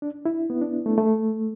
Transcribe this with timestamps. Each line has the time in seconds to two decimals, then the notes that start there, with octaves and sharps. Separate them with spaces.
0.02 D4
0.26 E4
0.50 B3
0.61 D4
0.86 A3
0.98 A3